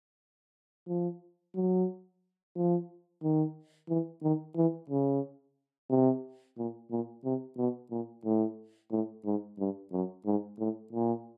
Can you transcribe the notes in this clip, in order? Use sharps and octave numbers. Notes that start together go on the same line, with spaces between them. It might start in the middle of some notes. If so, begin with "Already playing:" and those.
F3
F#3
F3
D#3
E3
D#3
E3
C#3
C3
A#2
A#2
C3
B2
A#2
A2
A2
G#2
G2
F#2
G#2
A2
A#2